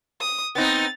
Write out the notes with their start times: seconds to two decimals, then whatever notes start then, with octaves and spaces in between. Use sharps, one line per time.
0.20 D#6
0.55 B3 C4 D#4 A6